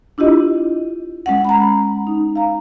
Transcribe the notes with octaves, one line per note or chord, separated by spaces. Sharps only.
D4 E4 F4 G4 D#5
G#3 C#4 F#5
A#5 B5
D#4
F5 A#5